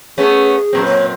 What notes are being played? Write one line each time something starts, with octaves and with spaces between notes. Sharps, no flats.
A3 B3 C#4 G#4
F#2 A#2 C4
C#5